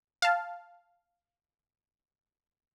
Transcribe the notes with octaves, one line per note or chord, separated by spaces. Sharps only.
F5 A5